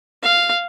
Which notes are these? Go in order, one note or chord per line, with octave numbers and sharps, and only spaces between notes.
F5